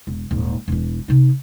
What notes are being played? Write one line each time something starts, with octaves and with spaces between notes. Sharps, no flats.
E1
D#1 G#2
E1 E3
C3 D#4